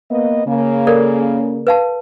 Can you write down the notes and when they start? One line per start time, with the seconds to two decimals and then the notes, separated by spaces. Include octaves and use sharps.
0.10 A#3 B3 D#5
0.47 C#3 A#3
0.87 A4 A#4 D5
1.67 B4 F5 A5